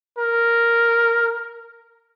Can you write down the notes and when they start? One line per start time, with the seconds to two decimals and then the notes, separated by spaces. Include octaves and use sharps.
0.18 A#4